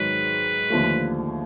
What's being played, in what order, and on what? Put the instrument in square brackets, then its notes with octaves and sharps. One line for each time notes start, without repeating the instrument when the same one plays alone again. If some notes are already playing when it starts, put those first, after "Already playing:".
Already playing: [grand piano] G#2 D#3 F#3 [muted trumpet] B4
[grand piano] D#2 D3 F3 A3